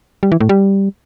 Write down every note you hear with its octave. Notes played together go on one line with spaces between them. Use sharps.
G3
E3
A2
G3